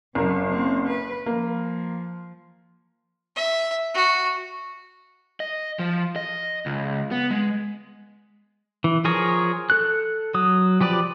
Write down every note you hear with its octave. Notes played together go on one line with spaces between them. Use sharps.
F#1 C3 F#3 A#4
A#3 C4
B4
F3 A#3
E5
F#4
D#5
F3
D#5
C#2
B3
G#3
E3
F3 G#4 A#4 C#5
A4 F#6
F#3 D#6
F3 G4 B4 D5